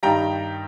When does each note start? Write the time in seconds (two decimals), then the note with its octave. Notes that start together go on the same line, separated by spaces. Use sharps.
0.03 G2 D#3 G3 G5 A#5